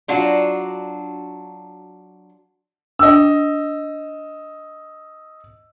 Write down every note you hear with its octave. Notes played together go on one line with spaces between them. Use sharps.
F#3 D4 F4 F#4
D4 D#5 G5 E6